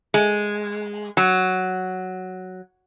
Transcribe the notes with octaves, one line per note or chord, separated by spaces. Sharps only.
G#3
F#3